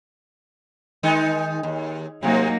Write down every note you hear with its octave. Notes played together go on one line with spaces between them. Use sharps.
D#3 G#3 D#4
D#2
C3 F#3 G#3 A#3 D#4